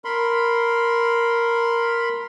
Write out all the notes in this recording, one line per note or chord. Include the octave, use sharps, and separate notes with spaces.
A#4 B5 C6